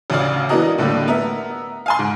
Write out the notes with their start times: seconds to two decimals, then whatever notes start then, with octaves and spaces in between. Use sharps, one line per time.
0.10 A1 D2 C#3 D5 F5
0.49 E3 B3 D4 F#4 A#4 D#5
0.78 A2 D3 G3 A3 A#3
1.08 B3 A#4 E5
1.86 F5 G#5 C6
1.99 G#2